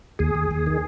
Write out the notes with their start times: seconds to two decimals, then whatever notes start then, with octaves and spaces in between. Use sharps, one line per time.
0.19 D#2 G#4
0.35 D#2
0.51 D#2
0.67 D#3